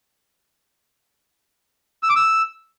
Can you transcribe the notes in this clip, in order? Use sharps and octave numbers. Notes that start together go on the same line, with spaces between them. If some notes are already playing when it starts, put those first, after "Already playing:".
E6
D6
E6